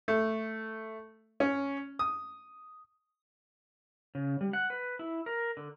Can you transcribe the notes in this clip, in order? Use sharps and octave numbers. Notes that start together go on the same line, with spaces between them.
A3
C#4
D#6
C#3
G3
F#5
B4
E4
A#4
D3